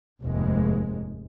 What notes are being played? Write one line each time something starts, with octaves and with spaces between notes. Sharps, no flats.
F1 D#2 G#2 G#3